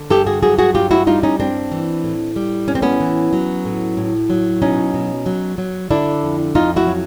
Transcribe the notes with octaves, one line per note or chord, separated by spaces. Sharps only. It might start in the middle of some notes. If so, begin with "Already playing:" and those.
Already playing: D3
G2 G4 A4
F#4 G#4
F#3 F#4 G#4
F#4 G#4
G2 F4 G4
E4 F#4
G3 D#4 F4
C#4 D#4
G2 C4 D4
E3
A2
G3
A2 C#4
C4
B3 C#4
E3
F#3
A2
A2
F#3
B2 C#4 D#4
B2
F#3
F#3
D3 D4 E4
F2
F2 D#4 F4
E4 F#4
F#3